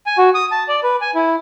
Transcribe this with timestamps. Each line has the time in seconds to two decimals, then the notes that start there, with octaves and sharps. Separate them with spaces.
0.06 G#5
0.18 F#4
0.35 D#6
0.51 A5
0.68 D5
0.83 B4
1.01 G#5
1.15 E4